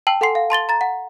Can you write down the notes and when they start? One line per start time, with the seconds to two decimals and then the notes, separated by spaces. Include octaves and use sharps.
0.07 G5 A5 E6 F#7
0.21 A4 F#5 G#5 C6 C7
0.35 F5
0.50 A5 C6 A6 G7
0.69 A#5 A6
0.81 F#5